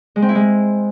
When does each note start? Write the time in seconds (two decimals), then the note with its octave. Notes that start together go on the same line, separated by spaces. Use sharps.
0.16 G#3
0.22 C4
0.29 E4
0.35 G#3